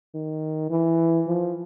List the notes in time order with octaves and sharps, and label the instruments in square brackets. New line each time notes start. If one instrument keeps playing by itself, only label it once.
[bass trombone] D#3
E3
F3